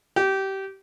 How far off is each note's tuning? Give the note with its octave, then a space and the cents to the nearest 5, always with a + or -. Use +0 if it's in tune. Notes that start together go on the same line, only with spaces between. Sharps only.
G4 -20